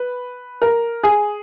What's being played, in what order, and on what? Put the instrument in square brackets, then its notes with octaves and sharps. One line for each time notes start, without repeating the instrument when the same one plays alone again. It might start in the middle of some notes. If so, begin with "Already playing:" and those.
Already playing: [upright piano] B4
A#4
G#4